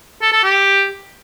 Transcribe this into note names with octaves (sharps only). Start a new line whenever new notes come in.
A4
A4
G4